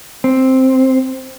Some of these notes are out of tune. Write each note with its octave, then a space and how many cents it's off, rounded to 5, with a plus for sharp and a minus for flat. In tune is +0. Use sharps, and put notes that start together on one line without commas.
C4 +0